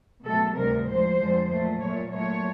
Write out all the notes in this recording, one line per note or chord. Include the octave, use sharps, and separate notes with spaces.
B2 F#3 A3 A4
D2 C3 D#3 G3 A#4
A2 F3 G#3 C5
F2 D3 F3 G#3
A#2 F#3 A3
A#2 F#3 A3 C#5
A#2 F#3 A3 C#5